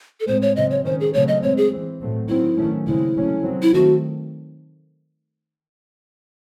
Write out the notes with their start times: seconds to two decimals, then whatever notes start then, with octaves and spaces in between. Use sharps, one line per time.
0.20 A4
0.27 A2 G#3 C4 C5
0.42 C#5
0.56 C#3 F#3 C4 D#5
0.71 C#5
0.85 D#3 G#3 C#4 C5
1.00 G#4
1.14 C#3 F#3 A3 C4 C#5
1.28 D#5
1.43 A2 G#3 C4 C#5
1.57 G#4
1.72 E3 C4
2.01 A2 F#3 A3 C4
2.29 D#3 F#3 C4 E4
2.58 D#3 F#3 A3 C#4
2.87 C#3 G#3 C4 E4
3.16 C3 F#3 A3 C#4
3.44 D#3 F#3 C4
3.62 E4
3.73 D#3 A3 C4 F#4